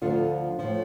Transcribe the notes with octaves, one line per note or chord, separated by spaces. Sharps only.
D2 D3 F3 F4
A2 F3